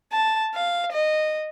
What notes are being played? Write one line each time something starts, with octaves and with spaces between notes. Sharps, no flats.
A5
F5
D#5